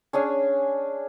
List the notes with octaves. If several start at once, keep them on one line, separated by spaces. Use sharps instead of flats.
C#4 D4 G#4 G#5